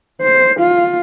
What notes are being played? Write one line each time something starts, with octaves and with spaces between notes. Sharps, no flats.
C5
F4